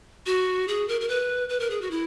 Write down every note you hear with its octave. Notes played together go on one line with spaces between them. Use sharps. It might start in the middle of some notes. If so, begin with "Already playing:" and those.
F#4
G#4
A#4
A#4
B4
B4
A#4
G#4
F#4
E4